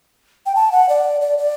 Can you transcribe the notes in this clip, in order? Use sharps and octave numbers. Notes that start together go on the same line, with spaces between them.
G5
A5
F#5
D5
D5
D5